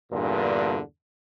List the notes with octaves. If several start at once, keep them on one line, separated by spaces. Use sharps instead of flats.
E2 G2 A#2 D3